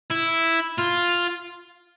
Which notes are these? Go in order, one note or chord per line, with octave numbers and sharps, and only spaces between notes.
E4
F4